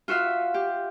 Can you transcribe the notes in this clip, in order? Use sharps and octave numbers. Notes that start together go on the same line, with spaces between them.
F4 F#4 E5 F5
G4